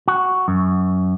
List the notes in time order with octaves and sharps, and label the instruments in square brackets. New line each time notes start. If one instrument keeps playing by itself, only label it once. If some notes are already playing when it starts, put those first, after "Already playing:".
[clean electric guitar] F#4
F#2